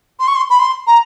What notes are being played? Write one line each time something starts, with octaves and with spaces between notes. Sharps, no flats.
C6
C#6
C6
B5
C6
A#5